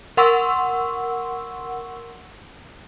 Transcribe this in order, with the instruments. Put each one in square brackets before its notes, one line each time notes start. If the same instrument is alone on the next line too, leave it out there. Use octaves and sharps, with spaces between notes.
[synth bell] A#4 F#5 C6 C#6 E6